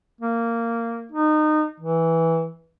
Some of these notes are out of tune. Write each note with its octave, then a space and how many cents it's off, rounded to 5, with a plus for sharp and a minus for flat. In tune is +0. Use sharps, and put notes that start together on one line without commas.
A#3 -15
D#4 -25
E3 -10